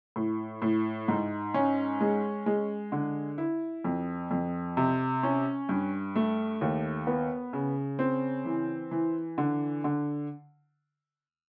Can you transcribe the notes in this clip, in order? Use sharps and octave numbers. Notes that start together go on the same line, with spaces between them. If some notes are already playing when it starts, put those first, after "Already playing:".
A2
A2
G#2
C#4
G#3
G#3
D3
E4
F2
F2
C3
C#4
G2
A3
D#2
B3
C#3
C4
E3
E3
D3
D3